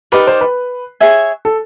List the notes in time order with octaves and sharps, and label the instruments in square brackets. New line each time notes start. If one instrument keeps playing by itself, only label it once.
[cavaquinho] D#4 G4 A#4 D5 [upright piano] B4
[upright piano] C5
B4
[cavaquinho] G#4 C#5 E5 G#5
[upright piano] A4